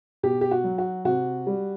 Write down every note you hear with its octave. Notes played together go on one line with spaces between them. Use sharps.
B2 G4
G4
F#4
F#3
F#4
C3 F#4
G3